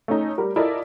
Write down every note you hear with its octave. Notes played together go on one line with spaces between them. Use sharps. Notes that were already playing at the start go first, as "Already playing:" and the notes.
A3 C#4 D#4
G3 A#4
E4 F4 A4 A#4 D5 D#5